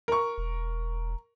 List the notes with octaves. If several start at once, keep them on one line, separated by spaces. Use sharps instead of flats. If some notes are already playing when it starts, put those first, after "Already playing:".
A#4 C#6
E1